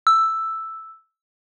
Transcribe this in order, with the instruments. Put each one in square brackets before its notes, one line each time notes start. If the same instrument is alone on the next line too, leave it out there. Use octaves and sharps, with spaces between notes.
[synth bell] E6